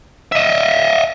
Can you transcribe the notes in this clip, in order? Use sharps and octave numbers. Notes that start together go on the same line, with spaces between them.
D#5 E5